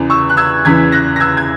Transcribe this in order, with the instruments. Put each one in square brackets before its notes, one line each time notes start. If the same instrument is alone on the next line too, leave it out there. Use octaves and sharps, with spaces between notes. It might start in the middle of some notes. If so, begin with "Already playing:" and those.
Already playing: [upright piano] E2 C#3 E3
C#6 E6
F#6
E6 G#6
E2 C#3 E3 G#6 B6
F#6 A#6
A#6
E6 G#6
G#6